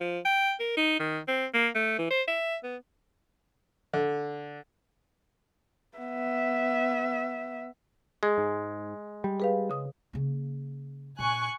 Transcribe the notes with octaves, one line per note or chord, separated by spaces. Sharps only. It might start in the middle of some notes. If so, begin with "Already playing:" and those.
F3
G5
A#4
D#4
D#3
C4
A#3
A3
E3
C5
E5
B3
D3
B3 E5
G#3 G#4
G#2
G3
G#4 B4 F5
C#3 D#6
C#3 A#3
A#2 G#5 C#6 F#6